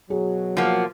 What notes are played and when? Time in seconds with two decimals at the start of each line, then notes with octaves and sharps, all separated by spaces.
0.10 B2 F#3 G#4
0.57 F3 A#3 F#5